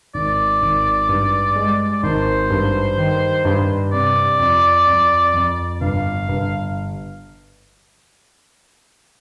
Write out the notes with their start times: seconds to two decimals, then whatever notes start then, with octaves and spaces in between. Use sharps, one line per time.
0.14 G#1 D5
0.62 G#1
1.09 G2
1.55 G#3
1.93 D5
2.03 G#1 C5
2.50 G2
2.98 D#3
3.45 G2
3.93 C3 D5
4.39 F2
4.87 F2
5.34 F2
5.81 G1 F5
6.28 G1